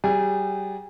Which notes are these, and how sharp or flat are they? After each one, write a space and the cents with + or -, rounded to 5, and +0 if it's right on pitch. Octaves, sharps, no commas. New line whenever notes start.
G3 -30 G#4 -30